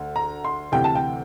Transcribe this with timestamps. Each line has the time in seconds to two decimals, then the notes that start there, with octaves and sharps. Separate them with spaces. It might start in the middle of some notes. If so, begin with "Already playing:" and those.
Already playing: D2 D3
0.16 A#5
0.45 C6
0.72 D2 C3 E3 G5
0.84 A5
0.95 G5